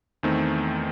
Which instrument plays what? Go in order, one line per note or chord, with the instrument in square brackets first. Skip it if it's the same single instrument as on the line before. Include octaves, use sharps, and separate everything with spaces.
[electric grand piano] E2 D#3 A3 C4